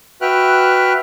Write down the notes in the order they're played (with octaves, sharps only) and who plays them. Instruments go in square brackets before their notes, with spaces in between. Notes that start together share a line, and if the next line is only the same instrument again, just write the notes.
[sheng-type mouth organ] F#4 B4 E5 G5 F6 F#6